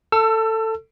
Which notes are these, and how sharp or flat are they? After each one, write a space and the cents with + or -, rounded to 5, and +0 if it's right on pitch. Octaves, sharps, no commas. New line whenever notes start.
A4 +15 E6 +35